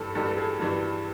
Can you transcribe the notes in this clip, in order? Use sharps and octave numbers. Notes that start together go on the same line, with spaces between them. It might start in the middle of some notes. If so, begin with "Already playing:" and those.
Already playing: G2 E3 G3 A4
G2 E3 G3 A4
A4
G#4
G2 E3 G3